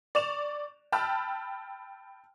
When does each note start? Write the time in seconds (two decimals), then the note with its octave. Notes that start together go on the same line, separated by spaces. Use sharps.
0.15 D5 C#6 E7 F7
0.92 G5 A5 B5 E6 F6